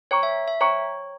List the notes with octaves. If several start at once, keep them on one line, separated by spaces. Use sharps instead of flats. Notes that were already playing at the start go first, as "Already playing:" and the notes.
C5 C#5 G5 A#5 C#6
E5
E5
C5 C#5 G5 A#5 C#6